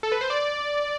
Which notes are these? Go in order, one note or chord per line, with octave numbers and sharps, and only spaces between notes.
A4
B4
C5
D5